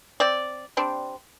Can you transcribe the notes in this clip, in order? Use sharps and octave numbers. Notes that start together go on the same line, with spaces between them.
C4 D5
G3 C4 D4